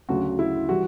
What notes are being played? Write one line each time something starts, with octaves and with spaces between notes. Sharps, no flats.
D2 C#3 F#3 F#4
E4
E3 G3 F#4